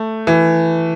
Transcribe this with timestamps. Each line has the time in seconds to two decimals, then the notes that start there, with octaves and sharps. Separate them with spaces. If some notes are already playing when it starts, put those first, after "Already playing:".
Already playing: A3
0.27 E3